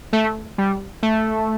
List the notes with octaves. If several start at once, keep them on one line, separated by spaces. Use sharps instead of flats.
A3
G3
A3